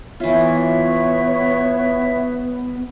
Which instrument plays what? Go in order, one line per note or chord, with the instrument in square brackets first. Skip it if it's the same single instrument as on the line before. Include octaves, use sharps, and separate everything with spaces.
[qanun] E3 F4 [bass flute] B3 [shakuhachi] C#5 [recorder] E5